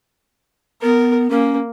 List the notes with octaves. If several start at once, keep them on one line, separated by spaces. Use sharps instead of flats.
B3 A#4
A#3 C#4